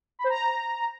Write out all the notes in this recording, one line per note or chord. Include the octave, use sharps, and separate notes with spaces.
B5
C5
A#5